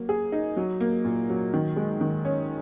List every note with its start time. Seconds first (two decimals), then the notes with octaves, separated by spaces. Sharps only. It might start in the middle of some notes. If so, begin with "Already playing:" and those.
Already playing: F#3 A#3
0.09 G#4
0.32 D#4
0.57 F#3
0.80 A#3
1.05 A#2
1.30 F#3
1.54 D#3
1.76 G#3
2.01 D#3
2.25 C#4